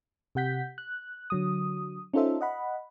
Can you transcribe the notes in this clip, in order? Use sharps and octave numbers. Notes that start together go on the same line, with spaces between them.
C3 G4 F#5 G6 B6
F#6
D3 F#3 D#6
C#4 D#4 F4 A4 C5 E5
D#5 F#5 B5